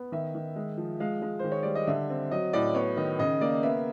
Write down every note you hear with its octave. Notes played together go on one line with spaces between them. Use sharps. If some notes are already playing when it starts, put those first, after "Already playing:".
Already playing: B3
D#3 E5
D#3
G#3
F3
G#3 F5
G#3
D#3 C5
C#5
G3 D5
D#5
D3 E5
C4
F#3 D#5
A2 D5
B3 C#5
D#3 D#5
C#3 D#5
A#3 D5
B3 E5